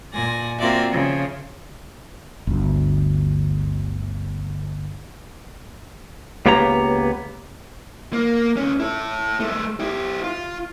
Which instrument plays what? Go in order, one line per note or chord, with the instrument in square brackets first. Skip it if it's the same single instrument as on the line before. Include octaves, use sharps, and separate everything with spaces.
[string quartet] A#2 D5 G#5 A#6
A#3 C4 F4 F#4 D5 E5
C#3 F3
[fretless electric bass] G1 D2
[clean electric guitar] C#2 A#3 B3 G4 C#5 A#5
[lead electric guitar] A#3
C#2 C#4
E4 A4
G#3 A3
E4 G4
F4